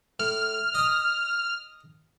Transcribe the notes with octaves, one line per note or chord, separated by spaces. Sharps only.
A2 F6
D#5 D#6